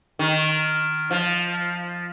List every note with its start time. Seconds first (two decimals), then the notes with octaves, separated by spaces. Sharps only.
0.19 D#3
1.11 F3